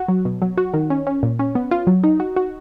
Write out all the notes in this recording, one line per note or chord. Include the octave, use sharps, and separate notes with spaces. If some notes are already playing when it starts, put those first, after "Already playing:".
Already playing: F#4
F#3
B2
F#3
F#4
D#3
C#4
C#4
A#2
C#4
B3
F4
F#3
D#4
F#4
F#4